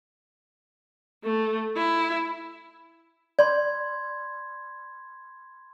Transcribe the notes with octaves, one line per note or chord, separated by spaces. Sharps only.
A3
E4
D5 B5 C6 G#6